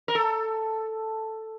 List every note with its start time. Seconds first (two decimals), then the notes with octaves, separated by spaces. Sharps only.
0.08 A#4
0.15 A4